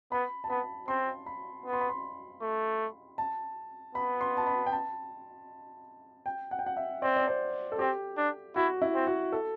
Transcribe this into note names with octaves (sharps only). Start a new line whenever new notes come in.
B3 B5
A5
B3 B5
C4 C6
B5
B3
C6
B5
C6
A3
A5
B3 B5
C6
A5
B5
G5
A5
G5
F#5
G5
F#5
E5
C4 D5
D5
C5
A4
C4 G4
D4
E4 F#4
E4
C4
F#4
A4